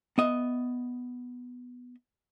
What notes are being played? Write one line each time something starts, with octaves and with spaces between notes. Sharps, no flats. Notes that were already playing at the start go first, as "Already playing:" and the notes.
B3 D#5 E5